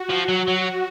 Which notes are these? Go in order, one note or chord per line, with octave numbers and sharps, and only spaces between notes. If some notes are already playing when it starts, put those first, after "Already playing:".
Already playing: F#4
F3
F#3
F#3 F#4